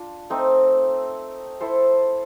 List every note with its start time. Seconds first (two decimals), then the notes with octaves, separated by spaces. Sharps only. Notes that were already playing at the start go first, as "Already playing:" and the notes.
Already playing: D4 F4
0.30 A3 C4 D#4
1.61 E4 A4 C5